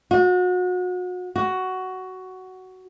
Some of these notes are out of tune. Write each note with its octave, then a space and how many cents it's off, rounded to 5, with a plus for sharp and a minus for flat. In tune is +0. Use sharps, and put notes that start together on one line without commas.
F#4 -35
F#4 +10